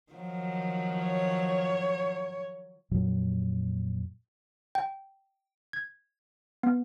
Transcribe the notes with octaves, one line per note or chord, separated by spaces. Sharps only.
D#3 F3 F#3
C#5
F2 A#2 F#3
G5
G#6
B3